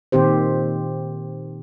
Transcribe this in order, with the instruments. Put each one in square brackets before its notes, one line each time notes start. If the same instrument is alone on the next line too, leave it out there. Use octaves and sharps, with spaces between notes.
[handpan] A#2 D#3 C4 G4 C5